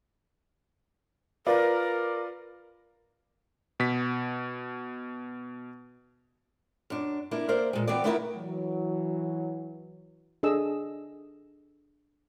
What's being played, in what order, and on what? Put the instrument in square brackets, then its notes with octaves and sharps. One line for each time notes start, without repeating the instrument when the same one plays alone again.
[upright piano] F4 B4 D5 [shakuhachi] A#4
[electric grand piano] B2 B6
[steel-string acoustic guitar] F#2 D4
A#3 D4 E4
A#3 A#4 C5 D5 E5
A#2 G#3
E3 B3 C4 F#4 D5
A3 B3 D#4 E4 A4 A#4
[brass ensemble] E3 F#3
[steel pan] D4 G#4 A4 D#5 E6